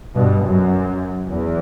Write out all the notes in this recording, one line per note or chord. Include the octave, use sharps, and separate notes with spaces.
G2 B2
F#2
E2